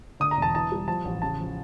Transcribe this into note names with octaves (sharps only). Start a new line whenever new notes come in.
D3 D#6
A#5
E1
A5
E3 A5
G3
F3 A5
A1
C#3 A5
F3